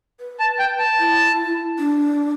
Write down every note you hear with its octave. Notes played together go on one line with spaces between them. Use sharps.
B4
A5
G5
A5
E4
D4